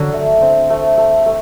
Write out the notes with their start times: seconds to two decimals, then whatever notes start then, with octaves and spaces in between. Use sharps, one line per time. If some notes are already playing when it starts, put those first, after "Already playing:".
Already playing: D3 F#3
0.13 A3
0.42 C4
0.70 A3
0.98 A3
1.26 A3